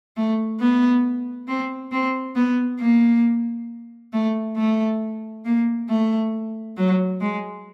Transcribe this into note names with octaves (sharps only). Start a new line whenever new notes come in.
A3
B3
C4
C4
B3
A#3
A3
A3
A#3
A3
F#3
G#3